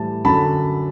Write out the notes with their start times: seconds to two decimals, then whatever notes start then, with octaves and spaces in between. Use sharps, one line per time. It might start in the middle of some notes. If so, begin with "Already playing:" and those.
Already playing: A2 E3 G3 A5
0.25 F#2 D3 F#3 A5 B5